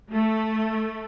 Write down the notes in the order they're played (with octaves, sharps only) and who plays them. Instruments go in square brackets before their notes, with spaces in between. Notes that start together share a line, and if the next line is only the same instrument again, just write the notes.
[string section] A3